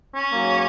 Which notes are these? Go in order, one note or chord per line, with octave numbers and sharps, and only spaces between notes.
C#4
G#2 F#3 A#3